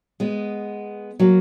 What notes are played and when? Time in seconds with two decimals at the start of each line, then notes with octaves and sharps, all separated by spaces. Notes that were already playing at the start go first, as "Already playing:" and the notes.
0.20 G#3 B3
1.20 F#3 A#3